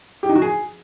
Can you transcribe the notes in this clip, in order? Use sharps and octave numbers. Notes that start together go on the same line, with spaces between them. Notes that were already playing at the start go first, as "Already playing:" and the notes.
G4
D#4
F#4
G#4